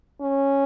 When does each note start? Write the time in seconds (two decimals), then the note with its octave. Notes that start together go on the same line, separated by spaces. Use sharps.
0.21 C#4